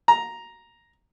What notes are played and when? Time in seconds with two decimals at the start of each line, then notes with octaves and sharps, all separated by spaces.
0.08 A#5